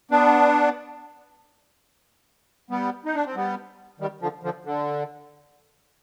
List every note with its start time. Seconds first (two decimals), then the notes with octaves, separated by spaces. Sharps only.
0.11 B3 D4
2.70 G3 B3
3.05 D#4
3.14 D4
3.25 C4
3.36 G3 B3
4.00 D#3 G3
4.21 D3 F3
4.43 D3 F3
4.65 D3